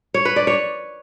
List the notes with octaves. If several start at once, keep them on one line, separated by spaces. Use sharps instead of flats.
C#5
B4
D5
C#5